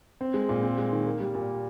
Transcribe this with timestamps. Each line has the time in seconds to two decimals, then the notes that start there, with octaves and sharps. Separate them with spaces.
0.21 C4
0.34 G#3
0.49 A#2
0.63 C4
0.78 G#3
0.92 D#3
1.06 A#3
1.20 G3
1.35 A#2